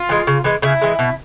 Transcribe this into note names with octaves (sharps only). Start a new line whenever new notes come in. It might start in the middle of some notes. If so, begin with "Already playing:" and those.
Already playing: F4
E3 G#3
C#3
E3 G#3
C#3 E4
E3 G#3
B2